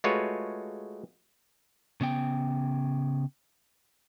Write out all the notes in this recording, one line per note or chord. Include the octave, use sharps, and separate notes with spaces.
G#3 A3 F4 F#4 B4 C#5
C#3 B3 G5